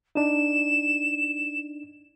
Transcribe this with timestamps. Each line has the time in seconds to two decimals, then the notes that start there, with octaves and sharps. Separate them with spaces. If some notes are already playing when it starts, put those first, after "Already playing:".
0.15 D4 D#4 E7